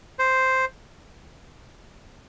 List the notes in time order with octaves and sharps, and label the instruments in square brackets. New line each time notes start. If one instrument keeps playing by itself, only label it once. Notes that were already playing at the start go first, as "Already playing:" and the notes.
[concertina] C5